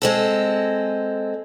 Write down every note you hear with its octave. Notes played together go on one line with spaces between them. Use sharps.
G#3 C4 A4